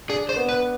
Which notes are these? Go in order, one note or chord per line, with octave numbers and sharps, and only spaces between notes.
D4 G#4
C5
B3
B4